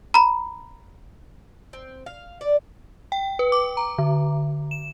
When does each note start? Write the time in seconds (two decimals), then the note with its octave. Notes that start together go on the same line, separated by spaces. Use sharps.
0.14 A#5 B5
1.73 C4
2.06 F5
2.41 D5
3.12 G5
3.39 B4
3.52 D6
3.77 A#5
3.98 D3
4.71 E7